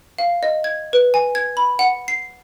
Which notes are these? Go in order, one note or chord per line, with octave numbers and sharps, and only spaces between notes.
F5
D#5
G#6
B4
G#5
G#6
B5
F#5
C7